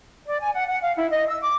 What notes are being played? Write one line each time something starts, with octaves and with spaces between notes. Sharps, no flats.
D5
G#5
F#5
F#5
F5
E4
D#5
E6
D6